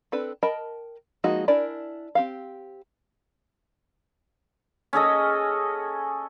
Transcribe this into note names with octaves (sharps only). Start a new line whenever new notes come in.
C4 D4 A4 B4
A#4 D#5 G5 A5 B5
F3 G#3 A#3 D#4 F#4
D4 E4 A#4 D5 G#5
C4 G4 F5
C#4 G#4 A4 D#5